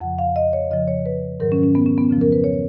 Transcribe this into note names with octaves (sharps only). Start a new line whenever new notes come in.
F2 C#3 F3 F#5
F5
D#5
C#5
F2 C#3 F3 D#5
C#5
B4
G#2 D#3 F#3 A#4
C#4
C#4
B3
C#4
B3
F2 C#3 F3 C#4
A#4
B4
C#5